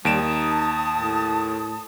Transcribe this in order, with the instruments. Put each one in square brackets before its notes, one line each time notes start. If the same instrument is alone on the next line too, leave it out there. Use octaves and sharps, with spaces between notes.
[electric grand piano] D#2 D7 E7 [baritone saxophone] G3 [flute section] A5 D#6
[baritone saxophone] D#4
A2